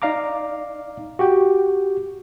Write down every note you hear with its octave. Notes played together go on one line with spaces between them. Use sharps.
D#4 D5 F5 A#5 D6
F#4 G4 G5